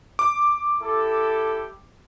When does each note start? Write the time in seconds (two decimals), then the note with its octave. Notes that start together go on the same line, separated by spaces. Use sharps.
0.19 D6
0.82 E4 G4 A4